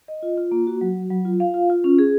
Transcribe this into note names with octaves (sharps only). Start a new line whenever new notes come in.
D#5
F4
F4
A#3
F#4
F#3
F#4
F#3
F4
F5
F4
F4
C#4
G#4